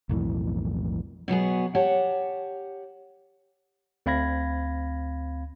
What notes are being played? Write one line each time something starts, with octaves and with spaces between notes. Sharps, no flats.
B1 F2 A2 E3
B2 F#3 B3 G#4
G4 C#5 F#5 A5
D2 C4 F5 B5 G#6 A#6